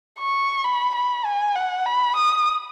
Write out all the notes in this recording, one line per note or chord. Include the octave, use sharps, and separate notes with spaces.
C#6
B5
B5
G#5
F#5
B5
D#6